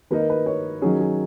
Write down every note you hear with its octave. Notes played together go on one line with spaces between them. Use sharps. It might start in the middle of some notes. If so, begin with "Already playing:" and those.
D#3 A#3 D#4 B4
A#4
B4
C#5
D#3 F#3 C#4 G#4
G#4